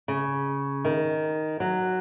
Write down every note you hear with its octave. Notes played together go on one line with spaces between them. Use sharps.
C#3
D#3
F#3